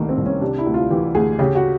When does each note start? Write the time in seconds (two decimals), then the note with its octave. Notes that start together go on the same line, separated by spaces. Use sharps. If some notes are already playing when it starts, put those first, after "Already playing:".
Already playing: C2 C3 D#3 A3 A#3
0.09 C4
0.17 C2
0.25 C#4
0.41 C3 D4
0.58 E4
0.66 D2
0.74 F4
0.91 E3 G4
1.15 D2 G#4
1.39 C#3 G4
1.55 F#4